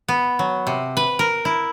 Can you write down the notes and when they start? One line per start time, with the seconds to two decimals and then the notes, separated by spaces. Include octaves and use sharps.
0.08 B3
0.39 F#3
0.67 C3
0.97 B4
1.19 A#4
1.45 E4